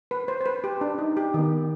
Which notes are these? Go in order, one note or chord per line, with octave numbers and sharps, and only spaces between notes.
B4
C5
C5
B4
G4
D4
D#4
G4
D#3 B3